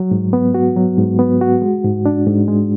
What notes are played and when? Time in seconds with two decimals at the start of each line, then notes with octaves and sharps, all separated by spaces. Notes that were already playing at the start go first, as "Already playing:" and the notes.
Already playing: F#3
0.11 G#2
0.33 B3
0.54 F#4
0.76 F#3
0.98 G#2
1.19 B3
1.41 F#4
1.62 G#3
1.84 G#2
2.06 D4
2.27 G#2
2.48 G#3